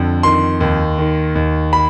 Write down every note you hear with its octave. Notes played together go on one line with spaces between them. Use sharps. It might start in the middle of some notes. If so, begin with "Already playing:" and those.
Already playing: F2 D3
D#3 C6
D#2
D#3
D#2
B5